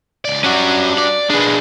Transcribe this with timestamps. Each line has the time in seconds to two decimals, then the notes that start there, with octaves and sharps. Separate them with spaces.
0.25 C#2 D5
0.44 G3 C#4 D4 F#4
0.98 D5
1.30 G#3 D4 G#4 B4